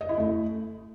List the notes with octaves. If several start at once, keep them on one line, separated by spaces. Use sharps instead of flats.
D#5
E4
A3